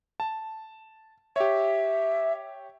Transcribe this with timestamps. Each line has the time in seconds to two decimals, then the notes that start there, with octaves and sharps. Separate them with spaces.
0.20 A5
1.36 G4 C#5 E5